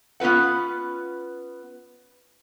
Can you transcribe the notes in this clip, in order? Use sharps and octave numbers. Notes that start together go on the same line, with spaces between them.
B3 C#4 F4 B4 F#5